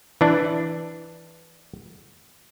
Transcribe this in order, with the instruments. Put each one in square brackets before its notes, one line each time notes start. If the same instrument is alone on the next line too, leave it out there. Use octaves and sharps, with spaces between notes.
[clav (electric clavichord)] E3 D4